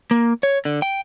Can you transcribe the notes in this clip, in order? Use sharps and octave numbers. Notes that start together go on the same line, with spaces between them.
A#3
C#5
D3
G5